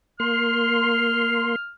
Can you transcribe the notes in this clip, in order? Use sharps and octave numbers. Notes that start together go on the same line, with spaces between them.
A#3 C6 F6